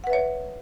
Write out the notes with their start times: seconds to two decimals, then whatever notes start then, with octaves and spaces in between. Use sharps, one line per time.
0.04 F#5
0.07 B4
0.10 E5
0.13 C#5